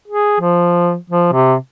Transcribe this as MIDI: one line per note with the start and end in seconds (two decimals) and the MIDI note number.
0.08 0.37 68
0.40 0.96 53
1.10 1.28 53
1.32 1.55 48